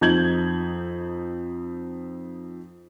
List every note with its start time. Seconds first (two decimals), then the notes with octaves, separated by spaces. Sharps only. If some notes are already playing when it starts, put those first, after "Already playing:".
0.01 F2 D#4 G6 G#6 F#7